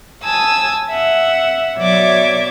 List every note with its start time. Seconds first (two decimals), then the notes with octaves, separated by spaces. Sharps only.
0.24 G#5 A5 D#6 E6
0.91 E5 F#5
1.78 B2 F#3 C#5 D5 E5 D6